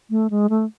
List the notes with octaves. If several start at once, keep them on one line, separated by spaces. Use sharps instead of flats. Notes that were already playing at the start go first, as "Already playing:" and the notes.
A3
G#3
A3